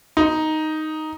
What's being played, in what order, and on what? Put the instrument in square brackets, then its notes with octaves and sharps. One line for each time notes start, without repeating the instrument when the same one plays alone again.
[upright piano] D#4